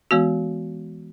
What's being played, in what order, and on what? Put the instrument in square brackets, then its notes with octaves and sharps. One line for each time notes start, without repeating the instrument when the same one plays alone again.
[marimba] E3 G#3 B3 F#4